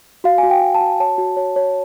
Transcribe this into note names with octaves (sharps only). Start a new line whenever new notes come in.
F#4 F5
G#5
F#4
G5
F#4
A5
F#4
C#5 A5
F#4
C#5
C#5